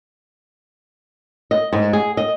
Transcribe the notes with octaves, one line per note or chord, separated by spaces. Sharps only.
D#5
G#2
G#4
D#5